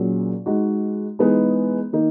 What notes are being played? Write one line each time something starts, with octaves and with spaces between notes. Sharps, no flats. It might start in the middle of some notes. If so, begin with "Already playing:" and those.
Already playing: A#2 F#3 C#4 G#4
G#3 D#4 F#4
E3 G#3 B3 D#4 G#4
D#3 A#3 D#4